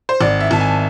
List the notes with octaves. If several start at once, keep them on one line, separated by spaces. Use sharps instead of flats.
C5
G#1 D5
E5
G#1 A5
G#5